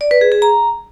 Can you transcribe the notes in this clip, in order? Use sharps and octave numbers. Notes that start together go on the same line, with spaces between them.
D5
B4
G#4
G#4
A#5